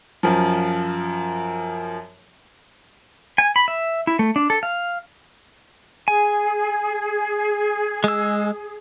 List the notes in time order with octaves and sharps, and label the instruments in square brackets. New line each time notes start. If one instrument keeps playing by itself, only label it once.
[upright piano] F#2 F3
[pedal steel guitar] G#5
B5
E5
E4
A3
D4
A4
F5
[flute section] G#4 [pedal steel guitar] G#5
[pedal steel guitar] G#3 E6